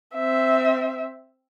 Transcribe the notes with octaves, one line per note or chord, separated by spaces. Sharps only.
C4 E5